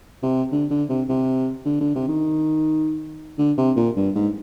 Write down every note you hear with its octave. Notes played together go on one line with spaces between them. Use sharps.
C3
D3
D3
C3
C3
D3
D3
C3
D#3
D3
C3
A#2
G2
G#2